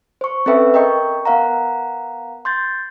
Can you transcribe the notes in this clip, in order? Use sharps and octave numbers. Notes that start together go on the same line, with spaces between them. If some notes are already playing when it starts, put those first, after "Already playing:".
C5 C#6
C4 C#4 A4 B4 E5 G5
A#4 D#5 G5 C#6
B3 A#4 F5 F#5 A#5
C6 G6 A6